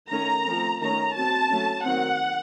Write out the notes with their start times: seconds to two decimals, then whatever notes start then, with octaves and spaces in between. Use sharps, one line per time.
0.11 D#3 A3 C#4 A#5
0.45 F3 A3 C4
0.81 D#3 A3 C#4 A#5
1.14 F#3 C4 A5
1.49 F#3 A3 C#4
1.84 D#3 F#3 C4 F#5